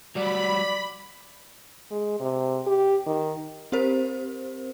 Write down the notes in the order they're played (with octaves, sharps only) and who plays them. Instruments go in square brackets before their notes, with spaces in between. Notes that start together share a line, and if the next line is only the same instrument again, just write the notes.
[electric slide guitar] F#3 G3 F#4 [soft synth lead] D5 [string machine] B5
[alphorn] G#3
C3
G4
D#3
[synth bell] C4 G4 A#4 C5